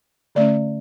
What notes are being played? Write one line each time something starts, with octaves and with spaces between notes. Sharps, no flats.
D3 A3 C#4 D5